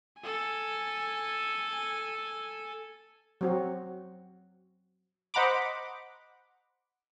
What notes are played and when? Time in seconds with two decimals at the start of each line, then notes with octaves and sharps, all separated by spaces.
0.21 A4 G#5
3.41 F#3 C4 F#4
5.34 C5 D#5 F#5 A#5 B5 D6